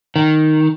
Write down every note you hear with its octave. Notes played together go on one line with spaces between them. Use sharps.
D#3